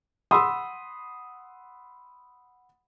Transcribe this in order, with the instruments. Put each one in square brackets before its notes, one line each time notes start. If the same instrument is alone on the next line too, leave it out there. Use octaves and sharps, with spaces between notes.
[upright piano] F#5 B5 C6 D#6 E6